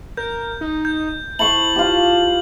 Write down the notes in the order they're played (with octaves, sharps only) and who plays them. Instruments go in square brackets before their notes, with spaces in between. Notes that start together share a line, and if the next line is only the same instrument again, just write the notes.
[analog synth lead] A#4 [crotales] G6
[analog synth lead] D#4
[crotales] G6
[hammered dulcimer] E4 C5 C#6 [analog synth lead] A5 [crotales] F#7
[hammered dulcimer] F4 G4